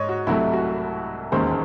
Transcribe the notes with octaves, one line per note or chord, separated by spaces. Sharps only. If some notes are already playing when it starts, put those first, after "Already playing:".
Already playing: G#2 C#5 D#5
F#4
C2 C3 F#3 A3 E4
F#4
E1 D#2 D#3 G#3 C#4 C5